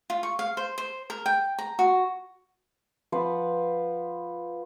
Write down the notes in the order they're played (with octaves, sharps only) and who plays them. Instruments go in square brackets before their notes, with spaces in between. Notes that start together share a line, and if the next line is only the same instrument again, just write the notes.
[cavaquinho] F4
C#6
F5
C5
C5
A#4
G5
A#5
F#4
[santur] F3 B4 C5 F#5